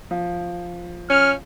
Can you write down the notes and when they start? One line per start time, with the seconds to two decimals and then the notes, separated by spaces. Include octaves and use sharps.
0.11 F3
1.10 C#4 F6